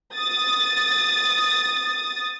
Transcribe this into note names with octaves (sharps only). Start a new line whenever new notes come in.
D#6 A6